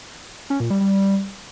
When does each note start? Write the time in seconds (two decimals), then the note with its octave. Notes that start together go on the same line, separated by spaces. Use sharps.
0.50 C#4
0.60 A#2
0.70 G3
0.80 G3